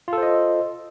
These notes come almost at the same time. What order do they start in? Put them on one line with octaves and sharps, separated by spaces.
F4 A4 C5 D#5